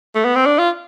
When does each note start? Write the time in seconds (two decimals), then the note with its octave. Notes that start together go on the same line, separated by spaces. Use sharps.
0.15 A3
0.25 B3
0.35 C4
0.46 D4
0.59 F4